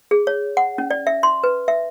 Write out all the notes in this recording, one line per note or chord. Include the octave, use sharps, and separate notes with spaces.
G#4
C#5
F#5
C#4
D5
E5
C6
B4
E5